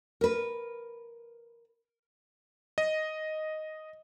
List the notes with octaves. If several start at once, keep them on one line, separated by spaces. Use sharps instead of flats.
A#4 B4
D#5